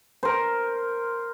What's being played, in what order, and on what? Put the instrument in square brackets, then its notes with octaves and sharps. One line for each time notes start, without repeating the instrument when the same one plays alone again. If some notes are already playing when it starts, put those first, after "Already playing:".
[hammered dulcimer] A#4 C5